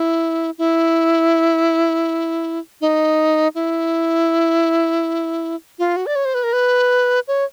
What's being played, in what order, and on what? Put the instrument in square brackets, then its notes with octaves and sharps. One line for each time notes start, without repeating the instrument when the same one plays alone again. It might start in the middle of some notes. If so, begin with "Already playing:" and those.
Already playing: [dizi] E4
E4
D#4
E4
F4
F#4
D5
C#5
C5
B4
A#4
B4
C#5